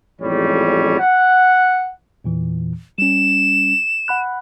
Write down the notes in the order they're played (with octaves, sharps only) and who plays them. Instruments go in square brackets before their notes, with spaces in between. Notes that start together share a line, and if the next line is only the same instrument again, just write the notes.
[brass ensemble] A1 F2 G#2 G3 C#5
F#5
[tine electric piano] E2 A#2 E3
[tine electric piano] G3 C#4 [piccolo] E7
[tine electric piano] F#5 B5 F#6